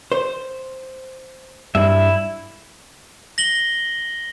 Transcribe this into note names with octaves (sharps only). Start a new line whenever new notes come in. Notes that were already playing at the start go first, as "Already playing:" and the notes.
C5
G2 E4 E5
A#6 F#7 G7